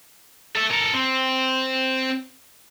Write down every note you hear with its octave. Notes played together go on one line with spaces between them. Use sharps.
A4 E5
A4 A#4
C4